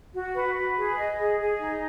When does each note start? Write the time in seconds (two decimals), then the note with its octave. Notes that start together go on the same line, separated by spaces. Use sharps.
0.14 F#4
0.34 B4
0.56 B4
0.77 G#4
0.97 D#5
1.19 G#4
1.40 G#4
1.61 D#4